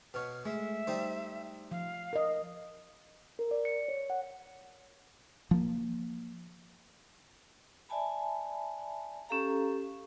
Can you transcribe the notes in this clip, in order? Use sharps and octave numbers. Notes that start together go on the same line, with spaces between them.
B2 C#5 F6
G#3 A3 E5
G3 D#4 C5
F3 F5
A#4 D#5
A#4
D5
C#7
C#5
F#5
F3 A#3
D5 E5 G#5 A5 B5
C#4 G4 A4 F5 A#5